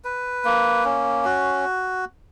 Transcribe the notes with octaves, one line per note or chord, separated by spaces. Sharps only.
B4
A#3
C#4
F#4